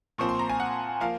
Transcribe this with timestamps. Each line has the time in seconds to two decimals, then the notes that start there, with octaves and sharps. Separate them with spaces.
0.18 A#2 F3 C4 C#6
0.29 C6
0.39 A#5
0.49 G#5
0.60 F#5
1.00 F3 A#3 F5